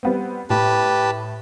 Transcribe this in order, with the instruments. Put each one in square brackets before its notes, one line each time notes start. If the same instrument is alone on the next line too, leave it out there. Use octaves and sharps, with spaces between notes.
[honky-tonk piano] G3 B3 C4
[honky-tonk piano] A2 [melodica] G4 B4 A5